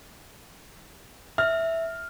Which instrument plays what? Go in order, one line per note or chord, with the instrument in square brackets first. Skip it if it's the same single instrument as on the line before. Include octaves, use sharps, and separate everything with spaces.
[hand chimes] E5 [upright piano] F6